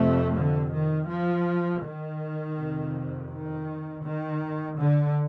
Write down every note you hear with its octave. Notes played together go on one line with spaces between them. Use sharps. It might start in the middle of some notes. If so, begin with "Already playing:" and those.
Already playing: F2 C3 A3
D3
D#3
F3
D#3
F2 C3
D#3
D#3
D3